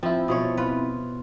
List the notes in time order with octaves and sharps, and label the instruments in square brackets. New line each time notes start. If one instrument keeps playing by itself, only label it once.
[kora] F3 [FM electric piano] C4 E4
[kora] B2 F3 C#5
F4 B4